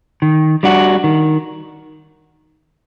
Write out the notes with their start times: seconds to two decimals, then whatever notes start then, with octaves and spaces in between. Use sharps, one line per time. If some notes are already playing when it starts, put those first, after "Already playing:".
0.22 D#3
0.63 G3 D4 F#4
1.04 D#3